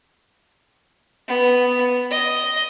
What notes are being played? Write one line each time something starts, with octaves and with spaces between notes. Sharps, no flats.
B3
D#5